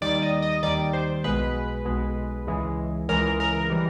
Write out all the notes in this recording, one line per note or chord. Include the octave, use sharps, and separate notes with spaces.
D#2 D#3 G3 D5
D#5
D#5
D#2 D#3 G3 D5
C5
B1 B2 G#3 B4
B1 B2 G#3
C#2 C#3 E3 G#3
C#2 C#3 E3 G#3 A#4
A#4
E3 G3